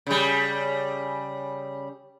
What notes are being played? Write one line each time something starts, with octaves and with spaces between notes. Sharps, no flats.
C#3 G3